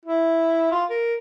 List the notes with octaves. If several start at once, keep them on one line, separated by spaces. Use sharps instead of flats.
E4
F4
A#4